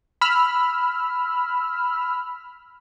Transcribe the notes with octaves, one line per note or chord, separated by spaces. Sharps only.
B5 E6 F6